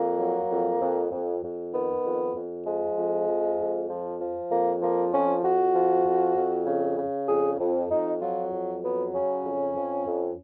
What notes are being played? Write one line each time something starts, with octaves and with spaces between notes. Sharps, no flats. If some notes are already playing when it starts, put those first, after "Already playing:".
Already playing: F2 A#3
F#3
F2
F2
F2
F2
D#3 B3
F2
F2
F3 G#3
F2
F3
F2
F3
F3
F2 A#3
F3 A#3
F2 C#4
F2 F#4
F3
F2
F2
C#3
C#3
F2 G#4
F2
F2 D#4
F#3 F4
F2
F#3 B3
C#3 C#4
F2
F2
F2